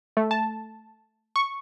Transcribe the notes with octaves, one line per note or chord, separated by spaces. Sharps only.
A3
A5
C#6